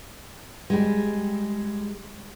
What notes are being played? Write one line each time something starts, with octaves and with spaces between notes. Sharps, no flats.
G3 G#3